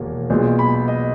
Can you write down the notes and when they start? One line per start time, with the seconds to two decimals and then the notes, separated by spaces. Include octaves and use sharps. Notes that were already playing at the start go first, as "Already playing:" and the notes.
Already playing: E1 D#2 A#3
0.30 B1 A#2 G#3 B3
0.59 B5
0.88 D#5